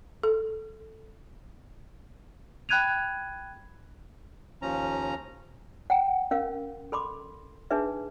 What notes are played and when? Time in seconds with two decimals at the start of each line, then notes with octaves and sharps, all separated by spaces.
0.23 A4
2.69 G5 B5 F#6 G#6 D#7 F7
4.62 D#2 F3 C#4 A#5
5.90 F#5 G5 A#5
6.31 C#4 A#4 F5
6.92 A4 B5 C6 D6
7.71 D4 D#4 G#4 B4 E5